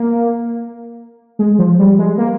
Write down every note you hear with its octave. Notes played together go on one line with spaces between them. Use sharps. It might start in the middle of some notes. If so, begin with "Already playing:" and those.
Already playing: A#3
G#3
F3
G3
G#3
A#3